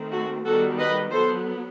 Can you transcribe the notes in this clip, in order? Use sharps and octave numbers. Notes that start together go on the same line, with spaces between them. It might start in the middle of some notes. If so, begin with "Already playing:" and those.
Already playing: D#3 A3 C4
F#4 A4
D#3 G3 B3 F#4 A4
B4 D#5
F#3 B3 A4 C5